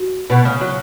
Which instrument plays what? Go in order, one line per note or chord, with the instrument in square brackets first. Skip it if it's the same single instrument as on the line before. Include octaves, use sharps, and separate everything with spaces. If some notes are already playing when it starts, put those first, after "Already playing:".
Already playing: [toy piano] F#4
[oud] B2
C#3
F#3